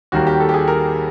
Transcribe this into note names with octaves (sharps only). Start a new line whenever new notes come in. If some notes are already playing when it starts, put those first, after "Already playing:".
D#2 D#3 G3 A#3 F#4
G4
A4
G4
G#4
A#4